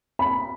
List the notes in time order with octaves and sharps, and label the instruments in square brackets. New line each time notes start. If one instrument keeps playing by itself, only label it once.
[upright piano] B5